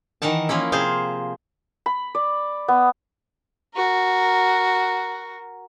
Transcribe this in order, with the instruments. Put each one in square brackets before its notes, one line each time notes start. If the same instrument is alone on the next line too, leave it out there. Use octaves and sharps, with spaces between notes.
[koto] D#3 E3 A#4 F#5 A5
F3 A#3 C#4 E4
C3 G#4 C5 F5
[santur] B5
D5
B3
[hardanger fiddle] F#4 A#4